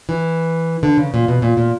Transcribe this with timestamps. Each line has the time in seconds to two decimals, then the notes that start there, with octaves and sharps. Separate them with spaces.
0.09 E3
0.83 D3
0.98 C#3
1.14 A#2
1.28 B2
1.42 A#2
1.57 A#2